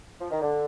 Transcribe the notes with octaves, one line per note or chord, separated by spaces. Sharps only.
F3
D#3
D3